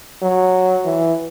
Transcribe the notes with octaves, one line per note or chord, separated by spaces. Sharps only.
F#3
E3